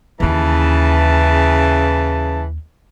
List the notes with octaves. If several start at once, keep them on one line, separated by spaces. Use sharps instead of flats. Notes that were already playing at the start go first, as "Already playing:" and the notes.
D#2 C#3 E3 C#4 A5